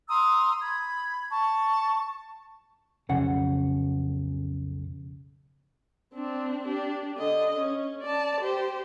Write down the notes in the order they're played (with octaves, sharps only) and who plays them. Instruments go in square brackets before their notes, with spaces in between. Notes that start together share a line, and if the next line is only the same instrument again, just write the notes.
[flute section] A#5 C6 D#6 E6
B5 G#6
A5 C#6
[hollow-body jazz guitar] B1 F2 C#3 F#5
[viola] C4 D4
D4 G4
D3 D#5
C#4
D5 A5
G4 C5